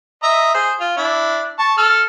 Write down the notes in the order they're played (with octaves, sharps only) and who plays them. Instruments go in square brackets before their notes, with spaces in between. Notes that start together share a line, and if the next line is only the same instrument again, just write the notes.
[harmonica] D#5 E5 A#5
G#4 C5
F4
D4 E4
A5 C#6
A4 F6